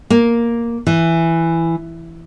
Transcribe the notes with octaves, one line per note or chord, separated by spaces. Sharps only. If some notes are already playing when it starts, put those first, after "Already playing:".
A#3
E3